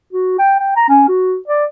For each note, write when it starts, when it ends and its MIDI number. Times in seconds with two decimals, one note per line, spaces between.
0.13 0.36 66
0.39 0.55 79
0.60 0.72 79
0.76 0.85 82
0.89 1.03 61
1.08 1.36 66
1.48 1.65 74